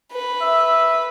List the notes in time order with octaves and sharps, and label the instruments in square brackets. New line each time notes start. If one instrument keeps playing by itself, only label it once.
[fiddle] B4
[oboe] E5